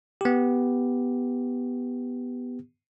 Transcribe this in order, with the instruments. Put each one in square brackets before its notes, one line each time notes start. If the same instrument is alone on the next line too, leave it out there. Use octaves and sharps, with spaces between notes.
[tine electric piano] B3 G4